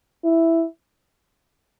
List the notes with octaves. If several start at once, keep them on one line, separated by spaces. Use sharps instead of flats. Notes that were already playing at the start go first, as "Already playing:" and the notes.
E4